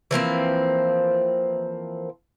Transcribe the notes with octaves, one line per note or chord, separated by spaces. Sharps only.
E3 F3 A#3 C4